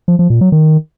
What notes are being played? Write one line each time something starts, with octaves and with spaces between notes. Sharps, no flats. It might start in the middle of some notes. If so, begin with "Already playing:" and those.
F3
F3
A#2
F#3
D#3